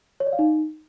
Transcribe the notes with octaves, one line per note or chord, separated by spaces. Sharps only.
C#5
D5
F5
D#4